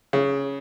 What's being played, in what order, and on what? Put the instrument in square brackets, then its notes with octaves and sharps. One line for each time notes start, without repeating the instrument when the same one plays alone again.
[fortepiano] C#3